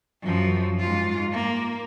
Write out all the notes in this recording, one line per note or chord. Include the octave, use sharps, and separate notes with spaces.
F#2 F3
G#2 F4
A#3